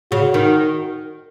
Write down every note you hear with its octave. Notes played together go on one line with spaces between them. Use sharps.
C#3 F#4
D#3